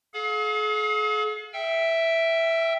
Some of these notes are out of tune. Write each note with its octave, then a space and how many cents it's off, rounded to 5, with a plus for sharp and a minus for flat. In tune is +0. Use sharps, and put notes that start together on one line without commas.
G#4 +45 F5 +40
E5 +0 G5 +0 E6 +35